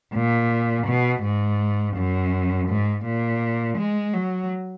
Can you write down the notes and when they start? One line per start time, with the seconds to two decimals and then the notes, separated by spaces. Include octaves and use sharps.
0.14 A#2
0.87 B2
1.23 G#2
1.96 F#2
2.68 G#2
3.04 A#2
3.78 G#3
4.14 F#3